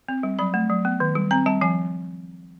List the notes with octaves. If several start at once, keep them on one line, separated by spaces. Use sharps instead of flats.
C4
G3
F#3 B5
A3
F#3
B3
D#3
G3
C4 A#5
G3 A5
F3 G#5